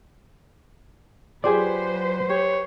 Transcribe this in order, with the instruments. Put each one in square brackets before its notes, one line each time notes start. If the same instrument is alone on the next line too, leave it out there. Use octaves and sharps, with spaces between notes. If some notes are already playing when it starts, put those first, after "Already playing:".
[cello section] F#3 B4 C5 [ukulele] F4 G4 G#4 [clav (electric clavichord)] D5 G#5
[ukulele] G4 [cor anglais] C#5